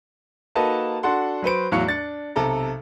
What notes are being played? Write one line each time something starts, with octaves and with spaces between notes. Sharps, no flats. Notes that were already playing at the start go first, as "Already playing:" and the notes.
A#3 D#4 F#4 A4 B4 A5
D4 F#4 A4 F#5 C6
F#3 B4 C5 D7
E2 A2 F#3 F5 C#6 C#7
D4 A6 C#7
B1 C3 A4 A#5